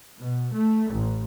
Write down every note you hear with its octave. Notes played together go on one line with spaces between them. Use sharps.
B2
A3
A1